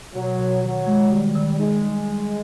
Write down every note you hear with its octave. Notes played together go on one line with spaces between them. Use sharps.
B2 F#3
B2
D#3 F#3
G#3
D#3 G3
D#3
G#3 D#4
G3
G3